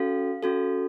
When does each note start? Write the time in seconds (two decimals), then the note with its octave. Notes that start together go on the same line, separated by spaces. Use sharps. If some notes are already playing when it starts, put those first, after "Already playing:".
Already playing: C#4 F#4 A4 F5
0.43 C#4 F#4 A4